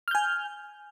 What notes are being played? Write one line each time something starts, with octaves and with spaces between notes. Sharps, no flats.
G#5 F6 G6